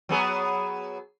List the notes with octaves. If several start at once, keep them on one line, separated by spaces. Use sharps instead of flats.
F#3 B3 G#4